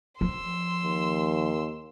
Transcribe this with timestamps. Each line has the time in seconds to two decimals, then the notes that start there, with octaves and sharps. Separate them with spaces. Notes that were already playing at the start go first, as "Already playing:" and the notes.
0.21 F3 C6 E6
0.84 D#2